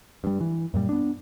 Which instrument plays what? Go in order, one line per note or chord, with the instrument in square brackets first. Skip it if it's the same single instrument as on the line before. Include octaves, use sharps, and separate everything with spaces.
[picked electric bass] G2 G3
E3
F#2 A#2 G3
B3 D4